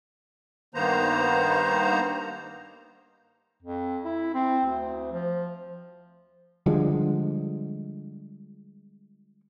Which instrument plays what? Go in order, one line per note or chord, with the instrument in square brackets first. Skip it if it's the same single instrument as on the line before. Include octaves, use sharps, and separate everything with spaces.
[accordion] G2 D#3 A#3 B3 C5 A#5
[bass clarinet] F2
E4
C4
D2
F3
[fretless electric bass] D3 F3 G3 G#3